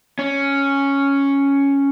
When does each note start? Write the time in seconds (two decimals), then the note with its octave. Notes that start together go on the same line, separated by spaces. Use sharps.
0.19 C#4